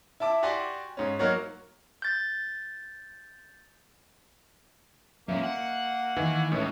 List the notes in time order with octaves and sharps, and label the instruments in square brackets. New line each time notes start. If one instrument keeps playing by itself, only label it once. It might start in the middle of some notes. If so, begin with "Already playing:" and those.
[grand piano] E4 E5 A5 D6
F#4 G4 D5 G#5 C6 D6
G#2 C#4
F#3 A#3 D#4 F#4 A#4 C#5
[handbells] G6 A6
[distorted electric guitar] F#2 A#2 [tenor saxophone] A#3 [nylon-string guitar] E5
[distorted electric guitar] F#5
[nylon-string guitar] D#3 [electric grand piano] E3
[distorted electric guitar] C#2 [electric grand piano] A2 [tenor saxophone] E3